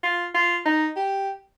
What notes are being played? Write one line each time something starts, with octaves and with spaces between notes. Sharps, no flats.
F4
F4
D#4
G4